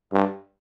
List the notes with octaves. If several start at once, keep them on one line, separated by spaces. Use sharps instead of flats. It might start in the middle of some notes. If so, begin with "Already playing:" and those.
G2